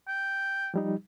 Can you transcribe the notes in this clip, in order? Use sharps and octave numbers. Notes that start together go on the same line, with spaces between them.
G5
F3 G3 D#4